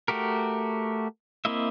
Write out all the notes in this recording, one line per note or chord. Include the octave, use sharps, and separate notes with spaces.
A3 F#4 G4 A#4
A#3 C4 E4 D#5 E5